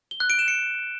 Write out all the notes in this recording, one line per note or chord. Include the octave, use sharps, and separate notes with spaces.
G7
F#6
D7
E7
C#7